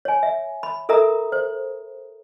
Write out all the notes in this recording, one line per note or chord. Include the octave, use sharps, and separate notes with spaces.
C#5 G#5
E5
B5
A4 A#4 E5 A#5 D#6
C5